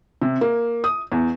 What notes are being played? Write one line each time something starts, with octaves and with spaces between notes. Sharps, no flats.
C3
A#3
D#6
E2